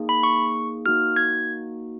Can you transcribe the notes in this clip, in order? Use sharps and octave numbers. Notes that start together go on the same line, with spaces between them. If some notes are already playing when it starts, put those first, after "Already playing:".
Already playing: A#3 D#4 G#4
B5
C#6
A#3 D#4 F#4 F6
G#6